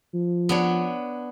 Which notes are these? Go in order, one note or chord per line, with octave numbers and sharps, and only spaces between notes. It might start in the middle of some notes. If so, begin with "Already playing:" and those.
F3
B3 D4 C#5